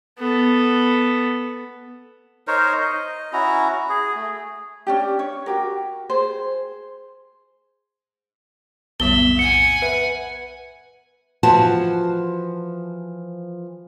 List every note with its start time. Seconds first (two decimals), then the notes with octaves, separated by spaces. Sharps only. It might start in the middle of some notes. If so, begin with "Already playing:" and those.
0.19 B3 A4
2.47 D#4 A#4 C5 C#5
2.81 D#5
3.33 C#4 E4 F#4 A#5
3.89 G#4
4.16 A3
4.87 C#4 D4 G4
5.19 C#5
5.46 F#4 G4 A#4
6.10 G#4 C5
9.00 B1 F2 A2 D#3 G3 B3 E5 G7
9.39 F#5 G#5 C#7
9.82 B4 E5
11.43 E3 F3 F4 F#4 A5